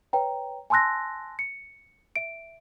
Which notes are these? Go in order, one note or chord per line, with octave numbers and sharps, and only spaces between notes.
B4 C#5 G5 A#5
G#5 A5 C6 E6 F#6 A#6
C#7
E5 D7